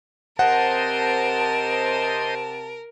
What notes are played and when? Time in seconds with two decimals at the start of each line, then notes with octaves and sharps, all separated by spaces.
0.39 C3 A#4 C5 D#5 F#5 A5